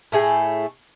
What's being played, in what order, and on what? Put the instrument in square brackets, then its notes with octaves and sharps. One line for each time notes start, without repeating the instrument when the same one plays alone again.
[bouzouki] A2 A3 G#4 G5